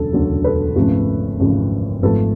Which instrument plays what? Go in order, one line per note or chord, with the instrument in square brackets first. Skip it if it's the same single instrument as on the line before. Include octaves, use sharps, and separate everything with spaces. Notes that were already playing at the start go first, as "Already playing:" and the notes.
Already playing: [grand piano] E1 D2 C#3 F#3 A4
E1 D2 C#3 F#3
A4 B4
G#1 F#2 C#3 F3 A3
G#1 F#2 C#3 F3 A3
G#1 G#2 F3 A3 A4 B4